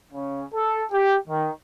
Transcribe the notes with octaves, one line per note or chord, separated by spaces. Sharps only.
C#3
A4
G4
D#3